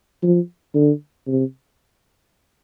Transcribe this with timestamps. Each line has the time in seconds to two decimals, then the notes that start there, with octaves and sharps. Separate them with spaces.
0.23 F3
0.75 D3
1.27 C3